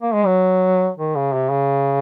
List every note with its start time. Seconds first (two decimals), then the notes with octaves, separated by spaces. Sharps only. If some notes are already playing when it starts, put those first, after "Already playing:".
0.02 A#3
0.14 G#3
0.26 F#3
0.97 D#3
1.15 C#3
1.33 C3
1.51 C#3